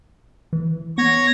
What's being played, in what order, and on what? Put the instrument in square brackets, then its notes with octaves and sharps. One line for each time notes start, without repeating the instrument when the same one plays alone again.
[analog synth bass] E3
[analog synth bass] B3 [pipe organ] C#5 G#6 A#6